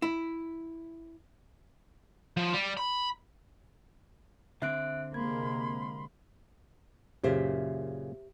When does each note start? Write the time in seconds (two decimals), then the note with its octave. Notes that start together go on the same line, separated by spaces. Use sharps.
0.02 E4
2.37 F3
2.53 G3
2.77 B5
4.62 D3 C4 E5 F#6 D7
5.14 C3 G#3 A#3 B5 C6 G#6
7.24 F#2 A#2 C#3 G4 C5 E5